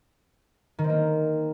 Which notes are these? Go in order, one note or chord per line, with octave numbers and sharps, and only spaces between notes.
D#3
C4
A#3